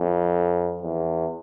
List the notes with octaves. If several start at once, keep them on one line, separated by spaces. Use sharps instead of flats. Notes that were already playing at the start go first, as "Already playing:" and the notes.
Already playing: F2
E2